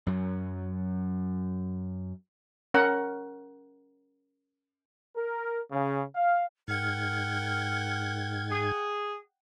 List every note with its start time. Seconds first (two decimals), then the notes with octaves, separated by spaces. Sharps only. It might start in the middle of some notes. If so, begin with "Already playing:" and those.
0.07 F#2 F#3
2.74 C#4 A#4 F#5
5.16 A#4
5.72 C#3
6.15 F5
6.68 G#2 A#4 F#5 G5 F6 G#6
8.50 G#4